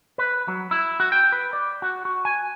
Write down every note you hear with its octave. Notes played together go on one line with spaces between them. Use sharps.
B4
F#3
E4
F#4
G5
B4
D5
F#4
F#4
G#5